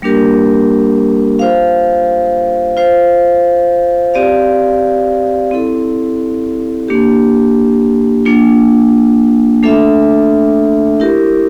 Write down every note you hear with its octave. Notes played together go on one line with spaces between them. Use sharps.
G3 A#3 D4 G4 A#4
F4 C5 F5
F4 C5 F5
C4 G4 D5 F5
C4 E4 A4
A#3 D4 G4
A#3 D4 F4
A3 D4 A4 E5
E4 G4 A#4